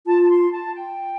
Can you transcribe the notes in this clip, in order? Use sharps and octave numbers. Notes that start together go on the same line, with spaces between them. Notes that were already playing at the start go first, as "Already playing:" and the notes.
F4 A5
A5
C6
A5
G5